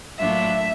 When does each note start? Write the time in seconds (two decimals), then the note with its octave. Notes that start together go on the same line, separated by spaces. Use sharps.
0.18 A2 F#3 A#3 D4 F4 E5